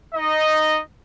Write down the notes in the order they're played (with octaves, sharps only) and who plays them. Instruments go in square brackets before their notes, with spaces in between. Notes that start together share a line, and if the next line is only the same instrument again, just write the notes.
[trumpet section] D#4 D#5